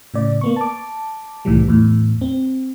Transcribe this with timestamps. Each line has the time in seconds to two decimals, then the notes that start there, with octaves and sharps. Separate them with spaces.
0.14 A2 C#3 D5
0.41 A#3 B3 C#6
0.56 A5 D6
1.45 C2 A2 D#3 E3 G3
1.68 E2 A2
2.21 C4